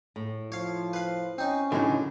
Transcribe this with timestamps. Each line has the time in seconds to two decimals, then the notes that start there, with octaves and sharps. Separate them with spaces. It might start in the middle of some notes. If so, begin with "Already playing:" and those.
0.16 A2
0.52 F3 C#5 F5
0.93 B4 F5
1.38 C4 C#4 D#4
1.72 C#2 F#2 A2 D3 D#4 F#5 G5